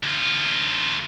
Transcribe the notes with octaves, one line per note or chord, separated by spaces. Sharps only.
D2 F4